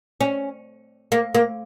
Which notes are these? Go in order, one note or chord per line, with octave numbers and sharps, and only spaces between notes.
C#4
A#3
A#3